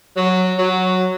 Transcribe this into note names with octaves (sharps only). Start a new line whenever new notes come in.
F#3
F#3